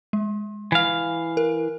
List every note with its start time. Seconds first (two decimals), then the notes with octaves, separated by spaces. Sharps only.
0.13 G#3
0.72 E3 F5
1.37 A#4